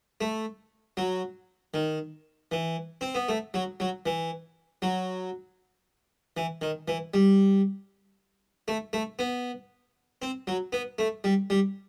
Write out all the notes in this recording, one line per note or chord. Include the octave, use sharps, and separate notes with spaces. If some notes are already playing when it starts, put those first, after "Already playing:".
A3
F#3
D#3
E3
C4
B3
A3
F#3
F#3
E3
F#3
E3
D#3
E3
G3
A3
A3
B3
C4
F#3
B3
A3
G3
G3